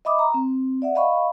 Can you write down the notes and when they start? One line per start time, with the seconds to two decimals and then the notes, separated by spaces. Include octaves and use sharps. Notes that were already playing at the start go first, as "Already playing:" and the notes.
0.05 D#5 E5 B5 D6 D#6
0.19 A#5
0.34 C4
0.82 D5 E5 F#5
0.95 D#5 F5 B5 C#6